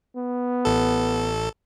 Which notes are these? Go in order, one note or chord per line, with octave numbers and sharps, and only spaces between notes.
B3
A1 A4